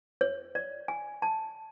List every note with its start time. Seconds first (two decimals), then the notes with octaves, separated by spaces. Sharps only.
0.21 C#5
0.55 D5
0.88 G#5
1.22 A5